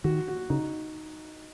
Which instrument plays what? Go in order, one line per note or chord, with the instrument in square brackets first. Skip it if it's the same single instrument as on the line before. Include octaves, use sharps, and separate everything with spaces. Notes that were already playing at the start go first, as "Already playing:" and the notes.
[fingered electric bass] D#3 [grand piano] F#4
[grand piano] F#4
[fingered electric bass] C#3 [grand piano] D#4